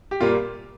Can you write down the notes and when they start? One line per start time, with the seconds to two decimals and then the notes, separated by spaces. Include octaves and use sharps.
0.11 G4
0.21 A#2 G3 A#3 F4